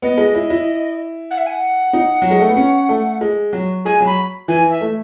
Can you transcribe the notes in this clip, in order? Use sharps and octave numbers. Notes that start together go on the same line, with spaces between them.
B3 D#5
G#3
E4
E4
F#5
E5
G#5
F#5
D#4
F#3
G#3
A3
B3
C#4
A3
G#3
F#3
G#3 G#5
F#3
B5
E3 G#5
E5
A3